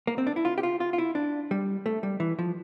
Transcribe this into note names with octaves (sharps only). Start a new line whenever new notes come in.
A#3
C4
D4
E4
F4
G4
F4
F4
F4
E4
D4
G3
A3
G3
E3
F3